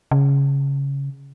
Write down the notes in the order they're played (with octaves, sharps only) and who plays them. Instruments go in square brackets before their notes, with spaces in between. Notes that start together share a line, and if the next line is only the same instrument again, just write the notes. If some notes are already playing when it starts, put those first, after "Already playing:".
[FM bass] C#3